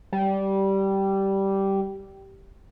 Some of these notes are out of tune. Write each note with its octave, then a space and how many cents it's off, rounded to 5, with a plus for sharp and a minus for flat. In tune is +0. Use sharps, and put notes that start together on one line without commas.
G3 -10